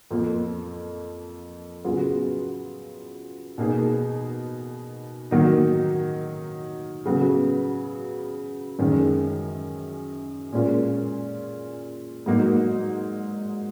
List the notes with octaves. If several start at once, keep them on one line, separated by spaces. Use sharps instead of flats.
F2 F3 A#3
C#3 F#3 B3 F4 G#4
B2 A#3 D#4 G#4
D#3 F#3 A#3 D#4
C#3 F#3 B3 F#4
F#2 D#3 G#3 C#4 G#4
A#2 G#3 C#4 F4 A#4
G#2 F#3 A#3 D#4